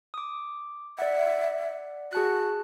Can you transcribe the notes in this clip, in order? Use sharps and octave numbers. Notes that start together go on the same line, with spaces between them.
D6 D#6
D5 E5 F#5
F#4 G#4 A5 F#6